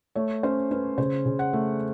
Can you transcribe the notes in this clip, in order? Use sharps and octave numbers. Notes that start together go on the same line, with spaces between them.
A3 C#5
C#4 C5
C#4 B4
C#3 C5
C#3
F#5
A3